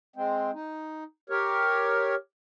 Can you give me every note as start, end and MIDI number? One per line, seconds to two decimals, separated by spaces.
0.16 0.51 56
0.16 0.51 60
0.53 1.04 63
1.30 2.15 67
1.30 2.15 70
1.30 2.15 73